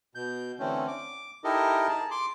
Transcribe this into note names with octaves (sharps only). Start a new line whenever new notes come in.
B2 G6
D3 E3 A3 C4 C#4
D6
D#4 E4 G4 A4 A#4 D#5
G#4 A5
C6 D6